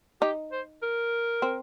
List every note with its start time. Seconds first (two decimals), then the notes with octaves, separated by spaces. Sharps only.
0.21 D#4 G4
0.52 C5
0.82 A#4
1.42 C4